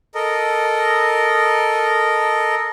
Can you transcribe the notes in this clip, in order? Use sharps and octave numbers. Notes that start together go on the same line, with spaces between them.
A4 A#4 D#5